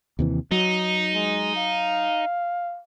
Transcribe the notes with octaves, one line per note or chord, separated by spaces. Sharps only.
D#2 C3 E3
F#3 D#4
G#3
F5